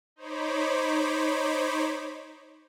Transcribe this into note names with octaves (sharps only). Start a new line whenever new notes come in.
D#4 C5 C#5 B5 D6